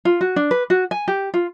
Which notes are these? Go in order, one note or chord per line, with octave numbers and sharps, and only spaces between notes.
F4
F#4
D4
B4
F#4
G#5
G4
F4